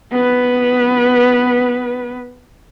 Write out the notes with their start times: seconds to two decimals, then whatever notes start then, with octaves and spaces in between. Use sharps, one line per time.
0.11 B3 B4